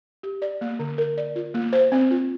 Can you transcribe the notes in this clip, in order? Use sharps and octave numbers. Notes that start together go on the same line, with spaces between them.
G4
D5
A#3
D3
A#4
D5
F4
A#3
C5
C4
F4